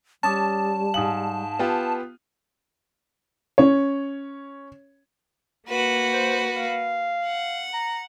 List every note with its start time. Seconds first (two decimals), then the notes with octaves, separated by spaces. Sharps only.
0.23 G3 C#4 A5 D6 D#6 A6
0.94 G#2 F5 G#5 D#6 F#7
1.59 B3 F4 G4
3.58 C#4 C#5
5.67 A#3 F#4 B4
6.13 C5
6.56 F5
7.25 F#5
7.73 A#5